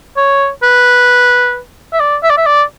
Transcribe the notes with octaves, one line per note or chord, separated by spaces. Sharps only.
C#5
B4
E5
D5
E5
D5
E5
D5